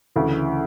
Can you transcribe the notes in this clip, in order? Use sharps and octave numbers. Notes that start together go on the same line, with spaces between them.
D2 C#3 E3